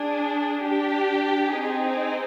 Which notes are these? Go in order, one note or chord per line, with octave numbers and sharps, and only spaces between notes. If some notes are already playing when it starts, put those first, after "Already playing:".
Already playing: D4 G#4
D4 G4
C4 D#4 G#4
C5